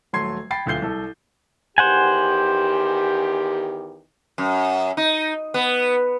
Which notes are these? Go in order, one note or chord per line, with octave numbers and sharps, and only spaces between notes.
D#1 F#3 A3 C6 G#6 C7
G5 B5 A6 C7
D1 D2 F4 G6 C7 G7
C2 A4
E2 D#3 G4 C5 F#5 G#5
F#2
D#4
B3